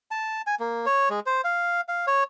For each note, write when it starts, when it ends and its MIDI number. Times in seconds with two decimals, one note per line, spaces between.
0.11 0.42 81
0.47 0.55 80
0.60 0.86 58
0.86 1.09 73
1.10 1.20 56
1.26 1.41 72
1.44 1.81 77
1.88 2.06 77
2.07 2.24 73